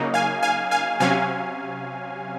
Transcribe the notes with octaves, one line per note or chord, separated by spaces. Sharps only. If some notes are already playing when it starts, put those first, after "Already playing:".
Already playing: C#3 F#3 A#3 D#4
F5 G#5
F5 G#5
F5 G#5
C3 F#3 C#4 F5 G#5